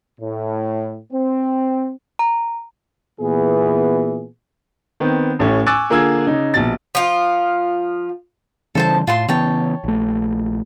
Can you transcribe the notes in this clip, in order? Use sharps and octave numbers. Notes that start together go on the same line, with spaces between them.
A2
C4
A#5
A#2 E3 B3 G#4
D#3 B3 C4
A1 A2 A3 C#4
G#5 C#6 D6 E6 F#6 A6
D3 A#3 F4 G#4 E6 G#6
C#3 D#4
A#1 B2 A6
F3 F4
C#3 E3 G3 A4 C5 A5
A2 F4 A5 C6
C#3 E3 B3 C#5 G5 A5
A#1 A3